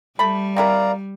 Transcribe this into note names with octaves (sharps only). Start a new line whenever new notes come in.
G3 A3 B5
C4 E4 A#4 D5 F5 A#5